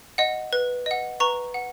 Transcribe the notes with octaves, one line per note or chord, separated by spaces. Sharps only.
D#5 F#5
B4
D#5 F#5
B4 A#5 C#6
F#5